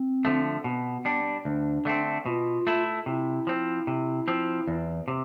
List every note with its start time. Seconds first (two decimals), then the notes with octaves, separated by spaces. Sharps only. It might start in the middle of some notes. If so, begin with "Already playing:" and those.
Already playing: C4
0.25 D3 F3 A3
0.64 B2 B3
1.05 G3 D4
1.45 D2 D4
1.85 D3 A3 C4
2.26 B2 F4
2.67 A3 E4
3.06 C3 E4
3.47 F3 C4
3.87 C3
4.28 F3 C4
4.67 E2
5.08 C3